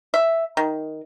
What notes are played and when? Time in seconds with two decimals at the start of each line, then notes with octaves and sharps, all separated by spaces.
0.14 E5
0.57 D#3